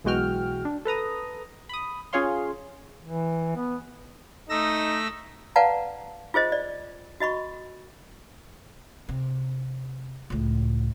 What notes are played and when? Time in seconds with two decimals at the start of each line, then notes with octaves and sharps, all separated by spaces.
0.04 B1 E3 G#3 F#4 G5 F6
0.65 D4
0.85 A4 B4 A#5 D#6
1.69 B5 D#6
2.13 C#4 F4 G#4 C#5 F5 C6
3.04 E3
3.57 B3
4.50 A3 D#4 E6 A#6
5.56 B4 D5 F5 F#5 A5 A#5
6.34 F4 G#4 C5 D#5
6.52 D5
7.20 F#4 D#5 B5 C#6
9.09 C3
10.30 C#2 A2